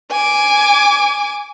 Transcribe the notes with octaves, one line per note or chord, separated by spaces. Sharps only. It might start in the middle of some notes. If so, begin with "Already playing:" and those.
G#5 D6